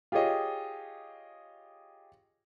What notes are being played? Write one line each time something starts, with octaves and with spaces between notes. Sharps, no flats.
F4 G4 G#4 C#5 D#5